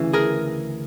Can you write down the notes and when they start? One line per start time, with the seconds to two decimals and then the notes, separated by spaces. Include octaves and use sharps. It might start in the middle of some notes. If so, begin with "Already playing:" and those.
Already playing: D2 C#3 E3
0.13 G#4 A#4